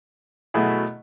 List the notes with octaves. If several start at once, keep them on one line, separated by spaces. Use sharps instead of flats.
B2 F#3 A3 E4 G#4